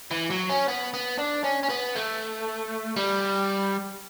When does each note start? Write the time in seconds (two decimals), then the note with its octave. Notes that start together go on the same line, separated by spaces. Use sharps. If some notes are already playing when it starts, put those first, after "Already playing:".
0.11 E3
0.30 F#3
0.49 C#4
0.68 B3
0.94 B3
1.19 D4
1.44 C#4
1.63 C#4
1.70 B3
1.95 A3
2.96 G3